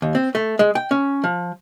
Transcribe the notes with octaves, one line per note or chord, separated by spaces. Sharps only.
D#2
C4
A3
G#3
G5
C#4
F3